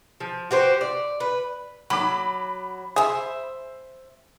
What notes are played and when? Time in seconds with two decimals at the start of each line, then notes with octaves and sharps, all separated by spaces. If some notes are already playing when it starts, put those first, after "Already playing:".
0.20 F3
0.51 F#4 G4 C5
0.81 D5
1.20 B4
1.90 F#3 B5 D6
2.96 G#4 C5 E5